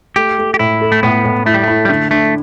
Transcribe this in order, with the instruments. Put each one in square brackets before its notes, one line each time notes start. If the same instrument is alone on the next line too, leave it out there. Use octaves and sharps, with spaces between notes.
[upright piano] A3 [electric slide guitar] G4
[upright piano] A3
[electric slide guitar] G4
[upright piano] A2 [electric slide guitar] E4
[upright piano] A4
[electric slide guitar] A3
[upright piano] A2 [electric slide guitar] B3
[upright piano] A2
[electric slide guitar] A3 [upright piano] E4
[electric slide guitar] G3
[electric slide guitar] A3 [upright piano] E4
[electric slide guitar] G3
[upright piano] D3 [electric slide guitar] A3
[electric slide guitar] A3 [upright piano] D4